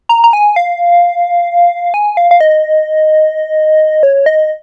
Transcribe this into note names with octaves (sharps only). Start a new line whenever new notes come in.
A#5
A#5
G#5
F5
G#5
F5
F5
D#5
C#5
D#5